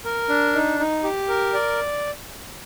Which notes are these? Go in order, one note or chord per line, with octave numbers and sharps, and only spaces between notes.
A#4
D4
D#4
D#4
G4
A#4
D5